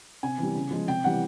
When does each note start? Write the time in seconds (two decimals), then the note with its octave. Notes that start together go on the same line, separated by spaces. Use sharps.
0.23 C3 G#5
0.38 E3 G3
0.55 C#3
0.71 F3 G#3
0.88 C3 G5
1.04 E3 G3 F#5